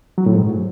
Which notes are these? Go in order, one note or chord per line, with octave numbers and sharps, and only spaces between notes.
F#3
A2
G#2